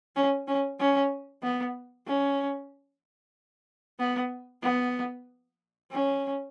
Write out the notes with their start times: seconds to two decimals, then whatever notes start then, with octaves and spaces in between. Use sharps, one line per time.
0.16 C#4
0.47 C#4
0.80 C#4
1.43 B3
2.07 C#4
3.99 B3
4.63 B3
5.91 C#4